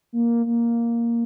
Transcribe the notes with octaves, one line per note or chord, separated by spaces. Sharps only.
A#3
A#3